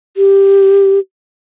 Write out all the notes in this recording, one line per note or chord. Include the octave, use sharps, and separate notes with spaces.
G4